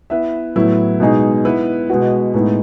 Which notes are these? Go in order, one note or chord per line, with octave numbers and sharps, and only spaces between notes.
B3 E4 B4 E5
A2 F#3 B3 E4
B2 G#3 D#4 G#4
B3 E4 B4
B2 G#3 B3 F#4
A2 G#3 B3 D#4